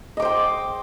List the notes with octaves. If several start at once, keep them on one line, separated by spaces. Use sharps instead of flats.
C5 D#5 G5 D6